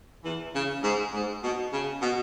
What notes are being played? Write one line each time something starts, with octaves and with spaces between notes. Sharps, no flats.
E2 E3
C#3
G#2
G#2
B2
C#3
B2